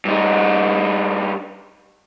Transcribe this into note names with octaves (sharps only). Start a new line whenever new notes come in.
G2 D#4